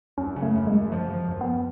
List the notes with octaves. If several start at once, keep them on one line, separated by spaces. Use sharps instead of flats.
F#2 C#4
C#3
A3
F#2
G#3
F#2
F3
F3
F#2
B3